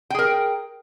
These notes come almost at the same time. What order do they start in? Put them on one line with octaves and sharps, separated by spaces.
G5 G#4 A#4